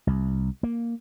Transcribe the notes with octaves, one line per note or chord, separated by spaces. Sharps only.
C2
A#3